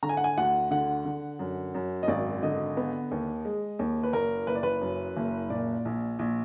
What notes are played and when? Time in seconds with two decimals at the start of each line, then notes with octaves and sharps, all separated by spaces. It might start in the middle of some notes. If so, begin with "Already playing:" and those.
0.03 D3 A#5
0.09 G#5
0.17 F#5
0.24 G#5
0.37 D2 F#5
0.71 D3 F#5
1.05 D3
1.39 F#2
1.75 F#2
2.03 D#5
2.08 G#1 D5
2.43 D3 D#5
2.77 B3
3.11 D#2
3.45 G#3
3.79 D#2
4.03 B4
4.13 F#1 A#4
4.47 F#1 B4
4.55 D5
4.63 B4
4.82 F#2
5.16 F#1
5.50 A#2 D5
5.85 A#1
6.19 A#1